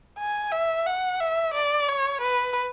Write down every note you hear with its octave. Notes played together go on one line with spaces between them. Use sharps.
G#5
E5
F#5
E5
D5
C#5
B4